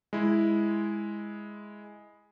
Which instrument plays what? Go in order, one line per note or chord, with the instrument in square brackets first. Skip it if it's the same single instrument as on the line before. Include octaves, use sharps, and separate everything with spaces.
[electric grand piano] G#3 E4